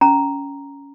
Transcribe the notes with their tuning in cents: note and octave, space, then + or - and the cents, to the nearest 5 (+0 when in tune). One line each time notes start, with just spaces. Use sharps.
C#4 +15 A#5 +0